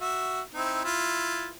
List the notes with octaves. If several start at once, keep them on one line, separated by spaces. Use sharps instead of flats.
F#4 E5
C4 D#4 E4
E4 F4